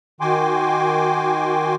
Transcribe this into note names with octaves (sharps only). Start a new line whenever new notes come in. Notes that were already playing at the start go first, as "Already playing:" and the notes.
D#3 F#4 G5 G#5 C6 D6